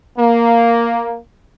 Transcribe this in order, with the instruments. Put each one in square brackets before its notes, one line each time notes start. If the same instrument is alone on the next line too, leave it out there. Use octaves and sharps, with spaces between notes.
[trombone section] A#3